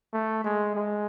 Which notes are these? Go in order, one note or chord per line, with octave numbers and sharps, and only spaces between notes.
A3
G#3
G#3